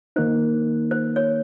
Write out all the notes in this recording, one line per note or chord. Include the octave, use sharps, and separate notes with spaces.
D#3 A#3 D#4 C5
C5
C#5